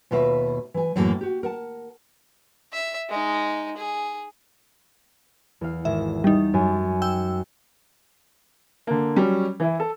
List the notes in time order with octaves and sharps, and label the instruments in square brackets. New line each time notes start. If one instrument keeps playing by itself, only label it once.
[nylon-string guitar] D#2 B2 F4 B4 E5
E3 G#5
F#2 A2 E3 A#3 F#4 A4
F#4 G4
A#4 F#5 A5
[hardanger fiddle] E5
G#3 D#4
G#4
[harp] E2 F5
[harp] G#1 [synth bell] E5
[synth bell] G3 D#4 [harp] G6
[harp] F#2 G#5
[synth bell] G5 E6
[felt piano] D3 A#3
F#3 G3 C#4
E3 E4
A4